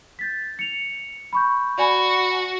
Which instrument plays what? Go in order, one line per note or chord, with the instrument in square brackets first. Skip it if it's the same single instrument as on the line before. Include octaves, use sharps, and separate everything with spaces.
[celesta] G6 A6 B6
C#7 F7
B5 C#6 G6
[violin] F#4 [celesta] D5 G#5 B5